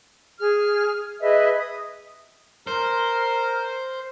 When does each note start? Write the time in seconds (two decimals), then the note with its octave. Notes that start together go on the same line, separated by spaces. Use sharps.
0.40 G#4 F6
1.20 G#4 B4 D#5 E5
1.58 D#6
2.67 A#4 C5